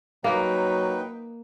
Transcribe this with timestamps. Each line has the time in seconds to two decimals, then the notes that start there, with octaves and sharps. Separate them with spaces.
0.24 F#3 A#3 D#4 B4 G5